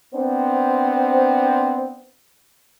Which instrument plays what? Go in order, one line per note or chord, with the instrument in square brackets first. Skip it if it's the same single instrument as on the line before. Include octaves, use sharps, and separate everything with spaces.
[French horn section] B3 C4 D4 C5